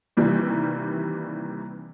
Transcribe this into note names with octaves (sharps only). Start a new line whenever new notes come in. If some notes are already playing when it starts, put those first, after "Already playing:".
C3 D#3 E3 G3 A#3